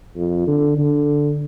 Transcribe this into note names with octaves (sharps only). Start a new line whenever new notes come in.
F2
D3
D3